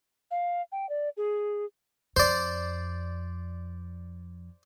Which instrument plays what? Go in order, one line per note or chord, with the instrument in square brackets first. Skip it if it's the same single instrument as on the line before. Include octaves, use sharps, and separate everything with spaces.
[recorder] F5
G5
D5
G#4
[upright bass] F2 [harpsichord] C5 D5